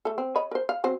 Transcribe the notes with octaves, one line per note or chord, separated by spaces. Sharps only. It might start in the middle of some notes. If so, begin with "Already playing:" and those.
A3 A4
C4
C#5 D#5 B5
A#4 C5
F5
F#3 C4 C5